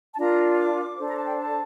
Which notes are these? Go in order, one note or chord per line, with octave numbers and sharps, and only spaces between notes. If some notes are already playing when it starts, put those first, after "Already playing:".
A5
D4 F4 A#4 A#5
D6
D4 A4 C5
A#5
A5
G5
A5